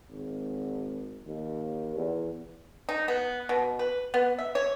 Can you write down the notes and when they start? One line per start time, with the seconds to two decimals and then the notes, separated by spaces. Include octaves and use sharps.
0.11 G#1
1.26 D#2
1.96 E2
2.89 D#4
3.08 B3
3.49 B2
3.79 B4
4.14 B3
4.39 E5
4.55 C#5